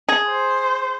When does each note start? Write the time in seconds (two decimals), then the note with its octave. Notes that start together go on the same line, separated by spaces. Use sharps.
0.09 G#4
0.28 C5